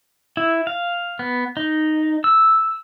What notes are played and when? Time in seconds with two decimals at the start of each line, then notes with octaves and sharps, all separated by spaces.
0.37 E4
0.67 F5
1.19 B3
1.57 D#4
2.24 E6